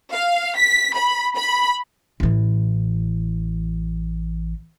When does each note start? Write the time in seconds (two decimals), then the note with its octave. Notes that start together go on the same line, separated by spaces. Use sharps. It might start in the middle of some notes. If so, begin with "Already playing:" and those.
0.12 F5
0.57 B6
0.95 B5
1.37 B5
2.20 A1 E3